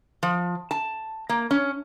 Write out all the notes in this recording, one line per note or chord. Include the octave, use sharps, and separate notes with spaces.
F3
A5
A#3
C#4